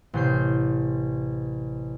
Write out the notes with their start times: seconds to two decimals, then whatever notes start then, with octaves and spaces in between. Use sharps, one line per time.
0.14 A1 C3 G6 C7